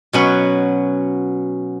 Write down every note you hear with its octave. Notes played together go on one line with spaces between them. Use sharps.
B2 F#3 C#4 B4